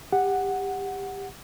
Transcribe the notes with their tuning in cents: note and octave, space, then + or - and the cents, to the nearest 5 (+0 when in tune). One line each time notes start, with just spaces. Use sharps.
G4 +20 F#5 +0